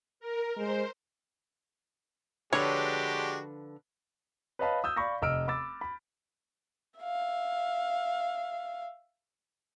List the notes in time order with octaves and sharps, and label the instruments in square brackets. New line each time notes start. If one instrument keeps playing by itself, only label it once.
[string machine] A#4
[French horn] G#3 [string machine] C5
[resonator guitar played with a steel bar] D3 F3 B4 [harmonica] G#3 D4 F#4 [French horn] G4 [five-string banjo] C#5
[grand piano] B4 C#5 D#5 F5 A5 B5
D#6 E6 G6
D5 F5 B5 C#6 A#6
F1 D#5 E6 F6 D7
B5 D6 E6 A6
B5
[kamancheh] E5 F5